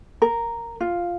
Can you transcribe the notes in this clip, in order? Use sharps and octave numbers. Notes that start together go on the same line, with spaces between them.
A#4
F4